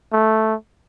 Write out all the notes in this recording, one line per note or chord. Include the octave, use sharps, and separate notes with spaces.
A3